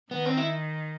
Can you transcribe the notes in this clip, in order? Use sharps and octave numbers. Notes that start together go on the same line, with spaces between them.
D#3 B3
C4
E4